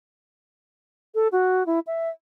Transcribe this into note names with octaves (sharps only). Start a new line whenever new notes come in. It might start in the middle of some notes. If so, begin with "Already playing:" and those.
A4
F#4
E4
E5